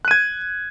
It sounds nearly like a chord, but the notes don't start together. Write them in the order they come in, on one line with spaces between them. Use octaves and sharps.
F#6 D#7 G#6